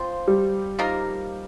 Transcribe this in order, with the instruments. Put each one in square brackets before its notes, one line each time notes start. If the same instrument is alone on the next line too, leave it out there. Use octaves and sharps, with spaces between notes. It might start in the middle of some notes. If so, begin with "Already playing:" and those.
Already playing: [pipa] F3 C4 F4 C5
[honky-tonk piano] G3
[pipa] F3 A#3 D#4 A#4